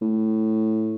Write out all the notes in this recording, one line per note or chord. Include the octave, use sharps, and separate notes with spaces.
A2